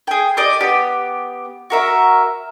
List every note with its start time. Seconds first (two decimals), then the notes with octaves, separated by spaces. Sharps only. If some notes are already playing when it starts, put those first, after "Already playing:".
0.07 G#4 G5
0.37 G4 D5 D#5
0.61 B3 G4
1.70 F#4 A#4 E5